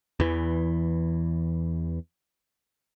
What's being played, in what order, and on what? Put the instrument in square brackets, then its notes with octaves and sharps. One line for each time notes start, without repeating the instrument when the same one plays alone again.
[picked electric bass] E2 E3